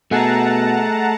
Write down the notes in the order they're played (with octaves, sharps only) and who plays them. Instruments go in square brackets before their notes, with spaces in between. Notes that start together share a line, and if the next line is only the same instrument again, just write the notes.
[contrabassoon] B2 [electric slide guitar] A3 G#4 [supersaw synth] F#5 A5 A#5